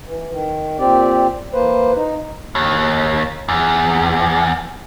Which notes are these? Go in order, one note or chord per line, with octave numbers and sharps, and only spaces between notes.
E3
D#3
A#2 C4 G4 D5
E3 A#3 B4 C5
D#4
D#2
E2